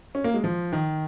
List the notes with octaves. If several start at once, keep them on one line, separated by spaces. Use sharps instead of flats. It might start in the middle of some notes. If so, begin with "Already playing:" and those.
C#4
A#3
G#3
F3
D#3